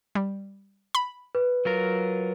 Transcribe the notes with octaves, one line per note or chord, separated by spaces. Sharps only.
G3
B5
B4
F#3 F4 A#4